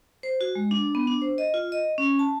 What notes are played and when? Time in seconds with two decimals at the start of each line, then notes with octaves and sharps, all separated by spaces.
0.23 C5
0.41 F#4
0.55 G#3
0.71 D4
0.95 B3
1.07 D4
1.22 C5
1.38 D#5
1.54 F4
1.72 D#5
1.98 C#4
2.19 A5